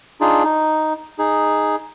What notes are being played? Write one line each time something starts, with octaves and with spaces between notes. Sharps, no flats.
D4 D#4 F4 G#4
D#4
D#4 G#4